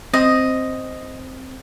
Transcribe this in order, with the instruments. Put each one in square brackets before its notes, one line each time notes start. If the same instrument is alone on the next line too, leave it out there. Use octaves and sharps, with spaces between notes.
[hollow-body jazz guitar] C4 [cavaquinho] D#5